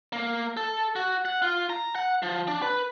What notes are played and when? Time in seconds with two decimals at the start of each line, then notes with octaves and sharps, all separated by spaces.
0.13 A#3
0.57 A4
0.96 F#4
1.25 F#5
1.42 F4
1.70 A#5
1.96 F#5
2.23 F3
2.48 D4
2.62 B4